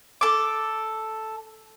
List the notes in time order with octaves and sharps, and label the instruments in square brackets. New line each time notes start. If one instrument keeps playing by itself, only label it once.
[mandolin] A4 D6